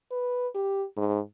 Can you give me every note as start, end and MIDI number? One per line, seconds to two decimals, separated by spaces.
0.11 0.47 71
0.55 0.84 67
0.96 1.19 44